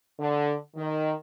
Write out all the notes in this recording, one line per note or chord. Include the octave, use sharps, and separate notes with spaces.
D3
D#3